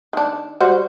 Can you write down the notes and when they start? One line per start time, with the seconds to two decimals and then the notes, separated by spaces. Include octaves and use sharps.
0.13 D#3 D4
0.60 G3 F#4 C5